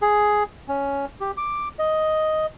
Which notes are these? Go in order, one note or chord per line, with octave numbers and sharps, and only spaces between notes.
G#4
C#4
G4
D6
D#5